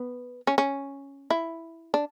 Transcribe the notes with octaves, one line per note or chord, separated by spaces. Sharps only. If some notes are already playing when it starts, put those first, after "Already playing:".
Already playing: B3
C#4
C#4
E4
D4